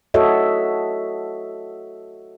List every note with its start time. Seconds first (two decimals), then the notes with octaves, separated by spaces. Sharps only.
0.14 F#4 A4 C#5 D#5 E5